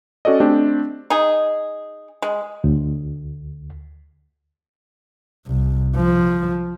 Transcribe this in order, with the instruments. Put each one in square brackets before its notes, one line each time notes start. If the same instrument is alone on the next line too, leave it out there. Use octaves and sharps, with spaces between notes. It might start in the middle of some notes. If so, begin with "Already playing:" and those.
[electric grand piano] C#4 F#4 A4 D5 D#5
A3 C4 D4 G4
[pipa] D#4 G#4
G#3
[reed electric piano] D2
[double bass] C2
F3